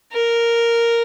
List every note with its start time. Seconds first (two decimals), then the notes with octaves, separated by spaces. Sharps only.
0.13 A#4